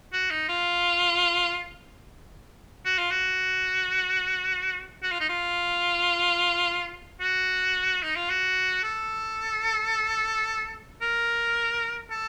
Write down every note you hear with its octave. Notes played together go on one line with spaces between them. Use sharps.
F#4
D#4
F4
F#4
F4
F#4
F#4
F4
D#4
F4
F#4
D#4
F4
F#4
A4
A#4
A4